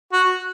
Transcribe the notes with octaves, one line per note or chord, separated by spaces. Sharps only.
F#4